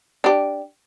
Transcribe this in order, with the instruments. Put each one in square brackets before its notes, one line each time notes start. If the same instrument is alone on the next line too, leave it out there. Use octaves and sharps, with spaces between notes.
[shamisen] D4 G4